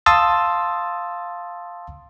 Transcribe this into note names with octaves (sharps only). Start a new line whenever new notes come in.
F5 A5 C6 D#6 E6 A6